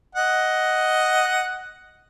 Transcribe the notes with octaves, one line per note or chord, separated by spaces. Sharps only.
D#5 F#5